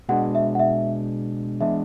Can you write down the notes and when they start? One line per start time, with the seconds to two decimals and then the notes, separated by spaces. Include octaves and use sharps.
0.09 B2 G#3 B3 D4 F#5
0.35 E5
0.55 F#5
0.60 E5
1.60 E3 G#3 B3 D4 E5